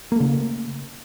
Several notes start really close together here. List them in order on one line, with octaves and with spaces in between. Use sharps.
A#3 A3 C#3